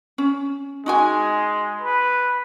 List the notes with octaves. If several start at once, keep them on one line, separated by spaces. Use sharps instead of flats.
C#4
G#3 D#4 F#4 G#5
B4